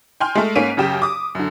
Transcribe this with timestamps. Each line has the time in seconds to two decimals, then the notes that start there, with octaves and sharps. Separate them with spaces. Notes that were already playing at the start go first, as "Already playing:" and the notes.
0.20 G5 G#5 C6 F6
0.35 G#3 A3
0.56 G#2 A#3 C#4 B6 D7 D#7
0.77 F#2 C#3 G4 E7
1.02 D6 D#6
1.35 F#2 D3